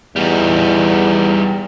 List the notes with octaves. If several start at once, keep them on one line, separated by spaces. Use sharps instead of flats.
E2 G3 D#4